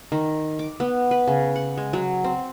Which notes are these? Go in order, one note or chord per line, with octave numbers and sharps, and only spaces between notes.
D#3
D6
B3
B4
C#3
F#5
G#3
F#3
C4